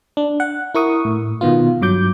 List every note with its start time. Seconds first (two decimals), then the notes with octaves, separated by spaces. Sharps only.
0.17 D4
0.40 F#5
0.75 E4 A#4 C#6 D#6
1.05 A2
1.41 B2 D#3 B3 F4
1.81 G2 F#3 D6 G6